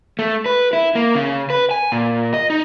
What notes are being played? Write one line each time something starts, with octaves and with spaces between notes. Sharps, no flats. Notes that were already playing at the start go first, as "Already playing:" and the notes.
A3
B4
E4
A#3
C#3
B4
G#5
A#2
D#5
D#4